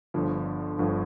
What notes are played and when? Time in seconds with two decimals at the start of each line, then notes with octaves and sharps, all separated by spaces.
0.14 G1 G2 D3 F3
0.78 G1 G2 D3 F3